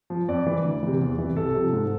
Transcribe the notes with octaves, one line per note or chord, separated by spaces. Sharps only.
F3
F2 D5
E3
D2
C3 E3
E2
C3 E3
C2 A4
C3 F3
G#2